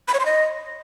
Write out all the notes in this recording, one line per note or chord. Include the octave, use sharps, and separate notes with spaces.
B5
C#5
C6
D#5